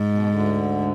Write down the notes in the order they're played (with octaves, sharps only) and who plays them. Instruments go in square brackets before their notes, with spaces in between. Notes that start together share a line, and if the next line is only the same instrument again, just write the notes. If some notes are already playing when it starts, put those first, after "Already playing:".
Already playing: [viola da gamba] G#2
[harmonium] B2
D2 D3